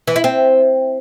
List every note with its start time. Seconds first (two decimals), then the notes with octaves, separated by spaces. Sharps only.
0.07 E3
0.16 E4
0.24 C4